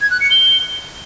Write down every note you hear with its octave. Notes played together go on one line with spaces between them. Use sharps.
G#6
F#6
C#7
G7